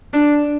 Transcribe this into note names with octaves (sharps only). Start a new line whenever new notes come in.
D4